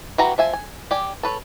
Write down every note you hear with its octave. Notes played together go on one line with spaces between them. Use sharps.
E3 E4 F#4 G4 A#5
F3 E5 G#5
G#5
G4 D5 G#5
A4 B4 C#5